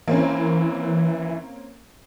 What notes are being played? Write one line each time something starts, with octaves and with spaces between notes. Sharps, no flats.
E3 A#3 C4 C#4